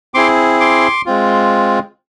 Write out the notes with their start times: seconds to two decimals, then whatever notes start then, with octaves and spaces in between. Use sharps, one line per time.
0.14 C4 E4 G#4 C6 D6
0.60 C6 D6
1.06 G#3 C4 F4